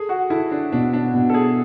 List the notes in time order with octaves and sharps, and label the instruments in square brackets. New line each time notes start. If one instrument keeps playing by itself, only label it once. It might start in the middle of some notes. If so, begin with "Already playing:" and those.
Already playing: [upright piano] G#4 [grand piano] A4
[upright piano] F#4
[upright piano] E4 [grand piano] A4
[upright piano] D4
[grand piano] B2 [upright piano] D4
[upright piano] D4
[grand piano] B2
[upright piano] A4
G#4